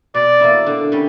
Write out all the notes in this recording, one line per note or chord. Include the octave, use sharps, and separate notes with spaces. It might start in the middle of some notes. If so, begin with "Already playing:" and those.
B2 D5
A#3 E4
D3
G3 C#4